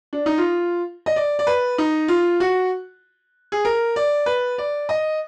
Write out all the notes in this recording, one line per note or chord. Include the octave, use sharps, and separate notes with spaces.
D4
D#4
F4
D#5
D5
D5
B4
D#4
F4
F#4
G#4
A#4
D5
B4
D5
D#5